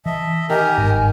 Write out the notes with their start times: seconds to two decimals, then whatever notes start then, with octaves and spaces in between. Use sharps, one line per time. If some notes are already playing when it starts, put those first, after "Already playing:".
0.06 E3 D#5 E5 A5
0.50 D#3 G4 A#4 G#5
0.78 G1 G#2